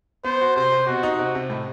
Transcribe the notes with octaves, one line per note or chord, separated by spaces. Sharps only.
B3 C5
F#4
C3 C5
C3
B2 F#4
D#4
C3
C3
A2